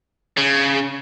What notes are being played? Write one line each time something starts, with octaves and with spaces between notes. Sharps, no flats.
C#3